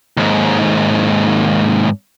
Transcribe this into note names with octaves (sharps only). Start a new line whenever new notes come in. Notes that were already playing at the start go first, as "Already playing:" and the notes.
D#2 G#2